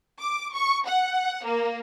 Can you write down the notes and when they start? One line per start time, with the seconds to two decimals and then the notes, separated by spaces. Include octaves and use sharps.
0.20 D6
0.55 C#6
0.87 F#5
1.45 A#3